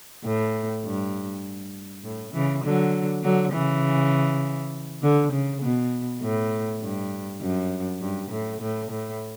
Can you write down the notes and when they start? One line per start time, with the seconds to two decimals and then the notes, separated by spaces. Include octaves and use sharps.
0.25 A2
0.85 G2
2.04 A2
2.33 C#3 E3
2.63 D3 F#3
3.23 D3 F#3
3.53 C#3 E3
5.03 D3
5.32 C#3
5.62 B2
6.22 A2
6.82 G2
7.41 F#2
8.01 G2
8.31 A2
8.61 A2
8.91 A2